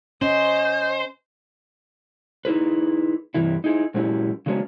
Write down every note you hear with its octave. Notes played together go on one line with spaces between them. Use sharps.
C#4 C5 D#5
D#4 E4 G#4 B4
G2 C3 E3 E4
D#4 E4 G#4
A#2 F#3 G#3 C#4 E4 G4
C#3 F#3 G#3 B3 C#4 D4